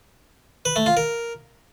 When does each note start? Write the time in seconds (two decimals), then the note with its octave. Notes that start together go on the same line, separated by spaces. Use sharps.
0.65 B4
0.76 A3
0.86 F4
0.97 A#4